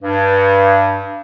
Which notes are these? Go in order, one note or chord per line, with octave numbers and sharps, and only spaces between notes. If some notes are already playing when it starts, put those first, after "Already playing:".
G2